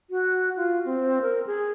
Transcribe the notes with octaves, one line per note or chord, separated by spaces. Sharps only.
F#4
F4
C4
A#4
G#4